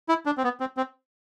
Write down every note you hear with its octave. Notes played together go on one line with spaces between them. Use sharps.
E4
D4
C4
B3
C4
C4